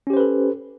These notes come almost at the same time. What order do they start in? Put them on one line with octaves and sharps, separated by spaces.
C#4 G4 C5 B4 A4